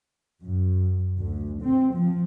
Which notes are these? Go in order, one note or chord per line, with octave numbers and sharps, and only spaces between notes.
F#2
D2
C4
F3